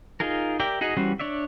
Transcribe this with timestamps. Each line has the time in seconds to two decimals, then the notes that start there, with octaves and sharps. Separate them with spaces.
0.20 D#4 F4 G#4 A#4
0.60 G4 A#4 D5 E5 G5
0.81 D#4 F#4 G#4 D#5
0.97 E3 G3 C#4 F#4 C5
1.20 D4 C#5 D5 E5